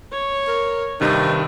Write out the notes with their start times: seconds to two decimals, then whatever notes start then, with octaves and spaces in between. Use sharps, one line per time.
0.12 C#5
0.47 A#4
1.01 G2 C3 D#3 C4 D#4